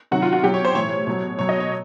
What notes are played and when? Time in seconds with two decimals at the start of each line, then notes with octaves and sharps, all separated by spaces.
0.11 C3 D#3 F#3 F#4
0.22 F4
0.33 F#4
0.43 B2 F#3 G4
0.54 C#5
0.65 C5
0.75 A2 E3 C#5
1.07 B2 F#3
1.39 B2 F#3 C#5
1.49 D#5
1.60 C#5